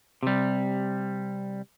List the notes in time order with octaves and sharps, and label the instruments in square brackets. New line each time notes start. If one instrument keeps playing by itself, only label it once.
[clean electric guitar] C3 G3